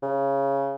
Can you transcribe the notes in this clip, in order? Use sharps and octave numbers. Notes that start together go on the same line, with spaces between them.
C#3